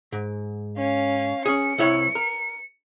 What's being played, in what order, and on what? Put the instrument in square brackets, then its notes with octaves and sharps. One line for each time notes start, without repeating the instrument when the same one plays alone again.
[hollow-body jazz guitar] G#2
[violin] C#4 F5
[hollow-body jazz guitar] C#4 G#4 [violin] C#7
[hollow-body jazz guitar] C2 E4 C#5
A#4